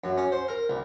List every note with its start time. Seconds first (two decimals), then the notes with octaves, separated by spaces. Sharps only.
0.04 F#2
0.18 C#4
0.32 C5
0.48 A#4
0.70 C2